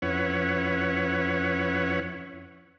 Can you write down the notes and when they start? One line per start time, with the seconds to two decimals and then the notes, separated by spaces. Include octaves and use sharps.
0.02 F2 C#4 E4 B4 C#5 F#5